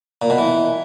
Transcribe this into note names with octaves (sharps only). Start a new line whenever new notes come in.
A#2
B2
E3